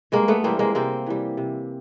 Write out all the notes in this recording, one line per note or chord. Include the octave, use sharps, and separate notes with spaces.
G2 G#3 A#3
A3 B3
E3 G3 A#3 C4
G#3 A#3
C3 A#3 C4
E3 G3
C3